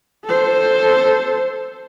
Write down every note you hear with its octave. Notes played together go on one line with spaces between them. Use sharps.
A4 C5